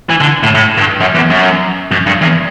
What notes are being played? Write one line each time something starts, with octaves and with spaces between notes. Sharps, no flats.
E3
D3
A2
A2
G2
F#2
E2
F#2
F#2
G2
E2